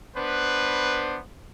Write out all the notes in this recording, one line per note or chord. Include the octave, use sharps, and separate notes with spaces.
B3 D4 B4 C5